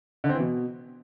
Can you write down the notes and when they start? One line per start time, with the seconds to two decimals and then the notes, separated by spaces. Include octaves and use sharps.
0.24 D3
0.29 C4
0.35 E3
0.40 B2